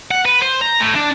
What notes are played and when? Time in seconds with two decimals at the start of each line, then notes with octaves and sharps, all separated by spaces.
0.11 F#5
0.25 B4
0.42 C5
0.61 A#5
0.80 A2
0.95 D4